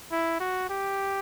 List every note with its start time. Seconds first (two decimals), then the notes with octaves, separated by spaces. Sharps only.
0.12 E4
0.40 F#4
0.70 G4